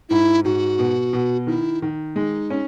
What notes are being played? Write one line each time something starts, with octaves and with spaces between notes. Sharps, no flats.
G#2 E4
G#2 F#4
B2
B2
D#3 E4
D#3
G#3 D#4
C#4